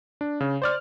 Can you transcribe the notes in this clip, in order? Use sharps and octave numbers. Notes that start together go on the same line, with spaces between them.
D4
C#3
C5 D5 F6